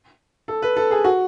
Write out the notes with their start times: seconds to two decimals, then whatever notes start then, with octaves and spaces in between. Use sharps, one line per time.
0.48 A4
0.62 B4
0.76 A4
0.91 G#4
1.04 F#4